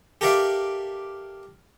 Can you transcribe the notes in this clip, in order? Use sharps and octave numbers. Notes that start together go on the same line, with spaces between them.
G4 A4 A#4 D5 E5 F5